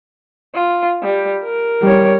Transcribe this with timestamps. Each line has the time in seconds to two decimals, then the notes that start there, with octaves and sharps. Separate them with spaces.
0.55 F4
1.03 G3
1.44 A#4
1.82 G3 C#5